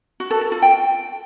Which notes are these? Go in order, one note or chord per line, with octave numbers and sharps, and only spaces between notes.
F#4
A4
A4
F4
G5